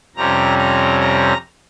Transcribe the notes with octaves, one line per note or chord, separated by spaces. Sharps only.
F2 C3 G3 C#4 A#5
A#5
A#5